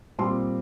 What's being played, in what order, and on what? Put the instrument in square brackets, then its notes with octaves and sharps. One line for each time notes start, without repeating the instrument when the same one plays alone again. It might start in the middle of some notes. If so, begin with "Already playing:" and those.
[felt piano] A#2 G3 C4 C6